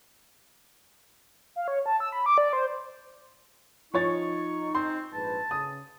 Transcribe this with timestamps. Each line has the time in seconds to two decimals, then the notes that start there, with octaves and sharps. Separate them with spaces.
1.56 F5
1.68 C#5
1.86 A5
2.00 E6
2.12 B5
2.26 D6
2.38 D5
2.53 C5
3.94 F3 D#4 C#5 C#6 A6
4.75 C4 C6
5.14 A#1 G#2 B4 A5
5.51 C#3 D#6